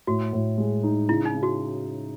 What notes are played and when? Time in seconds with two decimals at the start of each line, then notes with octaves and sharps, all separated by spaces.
0.07 A2 F#4
0.33 A2
0.58 G#3
0.84 D#4
1.09 C#3 E4
1.25 D#4
1.34 C#3
1.43 F#4